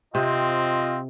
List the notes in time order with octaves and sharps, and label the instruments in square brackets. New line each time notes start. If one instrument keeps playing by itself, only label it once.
[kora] C3 [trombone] C4 [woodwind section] F4 D#5